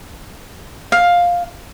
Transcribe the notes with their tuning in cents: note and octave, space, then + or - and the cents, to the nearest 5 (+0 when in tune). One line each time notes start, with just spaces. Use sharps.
F5 +10